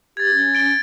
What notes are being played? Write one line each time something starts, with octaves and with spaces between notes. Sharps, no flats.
G4 G#6 A6
C#4
A6 D7 G7